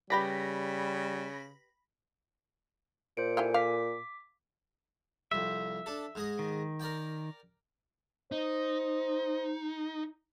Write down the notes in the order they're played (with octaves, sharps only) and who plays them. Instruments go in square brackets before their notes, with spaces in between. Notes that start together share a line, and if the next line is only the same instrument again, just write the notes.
[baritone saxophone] C#3 [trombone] G3 [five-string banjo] G4 B4 D5 [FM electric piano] B5 A#6 B6
[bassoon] A#2 [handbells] C5 C#7 D7
[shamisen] E4 G4 F5 [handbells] A4 G#5
[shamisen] F5 [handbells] D6 B6
[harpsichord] C2 F2 [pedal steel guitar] E5
[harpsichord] D4 A4
G#2 G#4 D#5
[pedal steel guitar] D#3
[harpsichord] A#4 D5 G5
[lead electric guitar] D#4 [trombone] C5